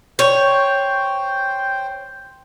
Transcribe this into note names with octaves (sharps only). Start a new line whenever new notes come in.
C5 C#5 G5